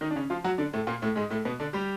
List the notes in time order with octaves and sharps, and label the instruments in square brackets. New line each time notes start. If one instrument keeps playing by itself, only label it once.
[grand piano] D#3 D#4
D4
C#3 C#4
F3 F4
F#3 F#4
D3 D4
A2 A3
A#2 A#3
A2 A3
G#2 G#3
A2 A3
B2 B3
D3 D4
G3 G4